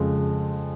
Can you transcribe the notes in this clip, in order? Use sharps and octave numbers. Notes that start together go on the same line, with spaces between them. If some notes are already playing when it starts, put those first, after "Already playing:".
Already playing: F2 C#3 G#3